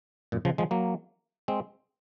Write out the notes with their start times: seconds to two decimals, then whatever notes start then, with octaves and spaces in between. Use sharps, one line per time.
0.32 F#2 A#2
0.45 C#3 F3
0.58 F3 G#3
0.71 F#3 A#3
1.48 G#3 C4